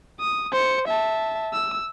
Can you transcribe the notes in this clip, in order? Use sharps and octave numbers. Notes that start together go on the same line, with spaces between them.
D#6
C5 C#7
E5 A5
E6